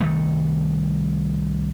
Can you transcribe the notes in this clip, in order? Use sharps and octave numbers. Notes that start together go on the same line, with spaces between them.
C2 D#3 G3 A3